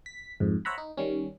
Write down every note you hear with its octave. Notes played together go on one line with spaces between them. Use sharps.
B6
F2 G#2
C5 C#5 E5 F#5 A#5 B5
D#4
D#3 G3 C#4